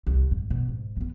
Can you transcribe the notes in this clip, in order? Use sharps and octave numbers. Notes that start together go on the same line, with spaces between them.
C2
G#2
B2
G#2
A3 B3